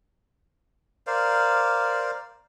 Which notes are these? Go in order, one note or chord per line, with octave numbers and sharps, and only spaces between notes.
A#4 C5 D5 F5